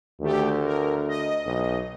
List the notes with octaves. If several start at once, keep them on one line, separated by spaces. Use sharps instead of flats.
D2 D#3 A3 G4
A#4
D#5
B1